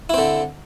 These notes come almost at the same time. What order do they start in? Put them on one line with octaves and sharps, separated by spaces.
E4 C4 D3